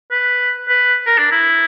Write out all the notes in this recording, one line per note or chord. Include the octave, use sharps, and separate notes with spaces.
B4
B4
A#4
D4
E4